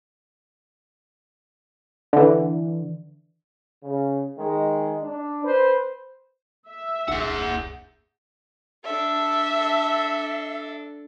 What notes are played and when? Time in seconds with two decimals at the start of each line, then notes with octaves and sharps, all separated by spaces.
2.13 D3 E3
3.82 C#3
4.36 D#3 G#3
5.02 D4
5.44 B4 C5
6.69 E5
7.08 D#1 C2 D4 G#4 F#5
8.85 D4 A4 E5